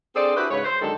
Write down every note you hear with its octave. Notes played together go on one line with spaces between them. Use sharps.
C4 D4 G#4 A4 C5 D5
D4 E4 F#4 G4 B4 C5
G#2 C#3 B4 C#5
C5
F#2 D3 D#3 G#3 A4